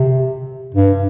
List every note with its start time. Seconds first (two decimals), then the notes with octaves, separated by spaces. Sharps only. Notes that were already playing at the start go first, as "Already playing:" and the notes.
Already playing: C3
0.75 G2